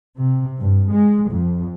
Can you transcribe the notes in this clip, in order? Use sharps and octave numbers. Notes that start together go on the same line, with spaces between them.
C3
G2
G#3
F2